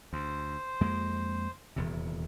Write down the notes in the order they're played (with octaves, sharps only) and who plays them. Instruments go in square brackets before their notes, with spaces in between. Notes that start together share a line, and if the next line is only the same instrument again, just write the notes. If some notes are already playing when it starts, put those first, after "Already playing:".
[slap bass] D2 [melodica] C5
[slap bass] F2 G#3 A#3
D#1 E2 C3